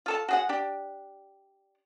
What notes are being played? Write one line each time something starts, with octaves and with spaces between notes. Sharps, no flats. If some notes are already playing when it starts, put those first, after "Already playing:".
F4 A4 A5
F#4 G#4 F#5
D4 G4